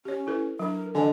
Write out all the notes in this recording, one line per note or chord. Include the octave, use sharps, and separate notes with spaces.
C#4 G4 C#5
E4 A4 B4
F#3 D4 A#4
D3 E3 D#5 G#5